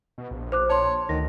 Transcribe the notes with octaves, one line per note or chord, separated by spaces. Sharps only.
B2
A#1
C5 D6 F#6
C#5 A5 C6
D2 D#3 A#6